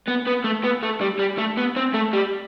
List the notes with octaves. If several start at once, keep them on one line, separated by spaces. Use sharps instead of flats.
B3
B3
A3
B3
A3
G3
G3
A3
B3
C4
A3
G3